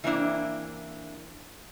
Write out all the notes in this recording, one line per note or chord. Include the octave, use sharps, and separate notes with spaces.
E3 A#3 C4 D4 E4